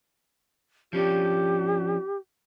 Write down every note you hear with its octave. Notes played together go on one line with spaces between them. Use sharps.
F3 C#4 D4 G4